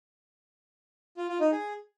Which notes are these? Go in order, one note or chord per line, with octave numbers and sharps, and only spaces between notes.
F4
F4
D#4
G#4